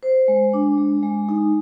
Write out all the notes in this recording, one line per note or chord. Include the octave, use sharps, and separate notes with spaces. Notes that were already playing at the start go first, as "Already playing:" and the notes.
C5
G#3
D4
G#3
G#3
D#4